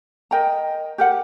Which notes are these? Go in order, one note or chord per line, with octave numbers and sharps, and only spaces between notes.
A#4 D#5 G5 A#5
G4 A#4 F#5